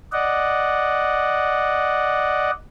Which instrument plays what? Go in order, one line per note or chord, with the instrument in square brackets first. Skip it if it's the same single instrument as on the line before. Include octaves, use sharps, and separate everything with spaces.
[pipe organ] D5 D#5 F#5